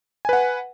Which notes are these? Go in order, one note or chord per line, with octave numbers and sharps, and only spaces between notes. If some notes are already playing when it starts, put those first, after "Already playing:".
B4 F#5 G#5